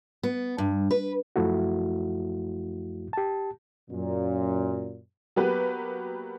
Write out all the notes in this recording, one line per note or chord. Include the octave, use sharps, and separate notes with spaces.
B3
G2
B4
F#2 F3 A3 E4 F#4
G4 A5
F#2 A#2
F#3 A#3 B3 G4 B4